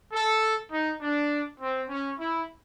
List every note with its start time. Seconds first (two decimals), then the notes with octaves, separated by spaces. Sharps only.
0.13 A4
0.71 D#4
1.01 D4
1.60 C4
1.89 C#4
2.19 E4